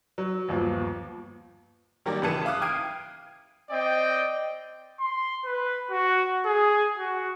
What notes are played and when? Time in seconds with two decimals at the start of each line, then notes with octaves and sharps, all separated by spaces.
0.18 F#3
0.49 G1 D#2 F3
2.06 D#3 F#3 G3 A#3 G4 D5
2.22 A1 C#3 E3 A5 C#7 D#7
2.45 E5 F5 D6 D#6 F#6
2.61 G5 F6 G#6 C7 D7 D#7
3.70 C4 D5 D#5 G5
5.00 C6
5.45 B4
5.90 F#4
6.46 G#4
6.98 F#4